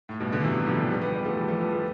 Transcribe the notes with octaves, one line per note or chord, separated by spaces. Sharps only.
A2
G2 B2
B2 D3
C3 E3
G3
D3 F3
G3 B3
G3 B3
G3 B3
F3 A3
E3 G3
F3 A3
G3 B3
F3 A3